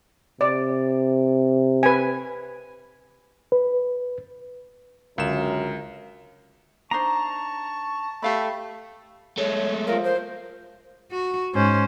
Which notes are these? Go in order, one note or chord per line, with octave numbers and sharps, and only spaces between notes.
C3 D5
B4 G#5
B4
C#2 F#2 D3 A#4 F5 E7
D4 D#4 C5 A5 A#5 C#6
A3 G4 F5 B5
G#3 A3 C#5
F3 A#4 F5
A#4 C5
F#4
G#2 C#4 C5